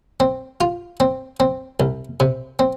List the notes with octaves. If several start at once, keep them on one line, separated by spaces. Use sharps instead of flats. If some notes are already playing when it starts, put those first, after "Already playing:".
C4
F4
C4
C4
C2
C3
C4